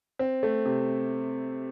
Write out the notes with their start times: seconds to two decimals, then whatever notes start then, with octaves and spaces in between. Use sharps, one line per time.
0.19 C4
0.43 A3
0.65 C3